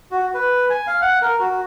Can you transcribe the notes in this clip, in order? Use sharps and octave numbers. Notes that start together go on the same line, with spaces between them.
F#4
B4
G#5
F5
F#5
A#4
F#4